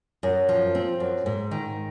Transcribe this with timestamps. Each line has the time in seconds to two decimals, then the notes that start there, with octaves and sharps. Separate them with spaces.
0.23 F#2
0.49 F3
0.75 C4
1.00 F#2
1.26 G#2
1.51 D#3